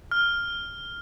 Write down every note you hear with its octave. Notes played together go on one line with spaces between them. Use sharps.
F6